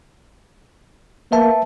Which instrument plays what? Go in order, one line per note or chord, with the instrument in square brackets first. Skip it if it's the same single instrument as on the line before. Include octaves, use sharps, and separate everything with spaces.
[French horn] A#3 [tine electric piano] B4 E5 A5